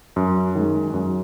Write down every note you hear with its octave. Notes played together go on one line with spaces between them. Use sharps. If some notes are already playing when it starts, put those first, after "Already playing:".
F#2
D#3 G#3
F#2